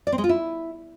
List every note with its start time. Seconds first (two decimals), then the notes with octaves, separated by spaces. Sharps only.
0.07 D5
0.12 C4
0.18 G#3
0.24 F4
0.29 E4